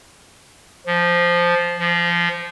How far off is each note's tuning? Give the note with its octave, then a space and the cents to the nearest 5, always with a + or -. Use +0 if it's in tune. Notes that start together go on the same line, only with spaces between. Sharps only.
F3 -5
F3 -20